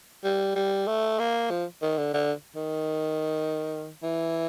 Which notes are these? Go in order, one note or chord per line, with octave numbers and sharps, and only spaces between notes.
G3
G3
A3
A#3
F3
D#3
D3
D3
D#3
E3